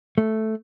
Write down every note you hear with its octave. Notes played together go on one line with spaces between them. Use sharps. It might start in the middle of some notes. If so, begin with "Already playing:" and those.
A3